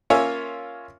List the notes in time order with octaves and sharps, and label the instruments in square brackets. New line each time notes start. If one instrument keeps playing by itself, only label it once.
[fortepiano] A#3 C#4 F4 C#5 E5 G#5